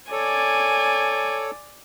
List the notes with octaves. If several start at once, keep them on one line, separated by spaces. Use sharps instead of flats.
A4 C#5 D5 G#5